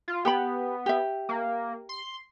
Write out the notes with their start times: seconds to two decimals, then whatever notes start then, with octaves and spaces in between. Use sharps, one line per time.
0.08 F4
0.25 B3 G4 G5 B5
0.86 G4 E5
1.29 A#3
1.89 C6